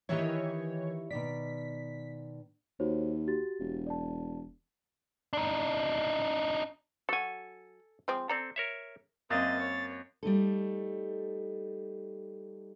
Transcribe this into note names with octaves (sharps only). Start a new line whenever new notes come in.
D#3 E3 E4 G4 C#5 D#5
B2 D#3 D5 B6
D#2 F#4 C5 C#5
F#4 G4 A6
E1
D5 A5
D4 D#4
F#3 F#4 A4 G#5
F3 G#3 C4
C4 A4 D5 A#5
A#4 C#5 E5
F#2 A#3 C4 D#5 A6
C#5
G3 A3 D#4 A4